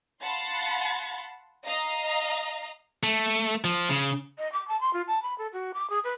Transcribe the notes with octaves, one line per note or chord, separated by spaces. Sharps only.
F5 F#5 A5 B5 C6 A6
D#5 F5 A#5
A3
F3
C#3
D#5
D6
A5
C6
F4
A5
B5
A4
F#4
D6
G#4
B4